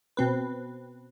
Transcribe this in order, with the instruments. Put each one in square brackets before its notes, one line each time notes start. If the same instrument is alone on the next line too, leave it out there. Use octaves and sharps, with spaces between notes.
[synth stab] B2 C4 B4